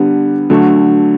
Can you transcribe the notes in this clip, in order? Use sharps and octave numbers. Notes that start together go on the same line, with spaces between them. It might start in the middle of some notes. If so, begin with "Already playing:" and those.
Already playing: D3 G3 B3
D3 F#3 A3